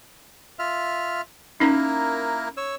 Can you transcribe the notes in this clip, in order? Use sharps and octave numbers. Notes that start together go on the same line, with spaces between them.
F4 E5 F6
A#3 C#4 D#4 E4 A#4
C#5 E6